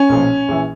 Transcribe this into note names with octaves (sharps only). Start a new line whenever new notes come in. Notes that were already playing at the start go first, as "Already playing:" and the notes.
Already playing: C#4
B1 A#2 F3
A#1 E3